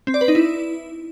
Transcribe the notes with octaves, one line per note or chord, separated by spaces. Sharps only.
C4
D5
B4
D#4
E4